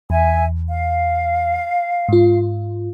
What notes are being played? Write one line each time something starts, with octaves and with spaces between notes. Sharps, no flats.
E2 E5 G#5
F5
G#2 F4